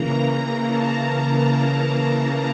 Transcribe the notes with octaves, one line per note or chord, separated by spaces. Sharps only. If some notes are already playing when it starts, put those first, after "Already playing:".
Already playing: C#3 E3 A#3 A#5
A5
A5